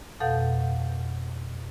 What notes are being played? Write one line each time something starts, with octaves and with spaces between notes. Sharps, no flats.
F2 B2 A4 F5 F#5 G6